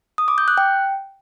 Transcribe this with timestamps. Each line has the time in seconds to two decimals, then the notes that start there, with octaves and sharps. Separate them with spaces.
0.18 D#6
0.28 D6
0.38 G6
0.48 F#6
0.58 G5